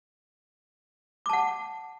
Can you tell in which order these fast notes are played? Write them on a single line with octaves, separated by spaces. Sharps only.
D6 A5 F#5